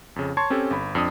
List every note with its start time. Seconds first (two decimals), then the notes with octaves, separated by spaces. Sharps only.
0.16 F2 C#3
0.37 C#5 A5 C6 C#6 G#6
0.50 C4 C#4 G4 A4
0.71 G1 B5
0.95 F2 D4 D#6